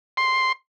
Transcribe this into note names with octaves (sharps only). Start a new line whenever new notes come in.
C6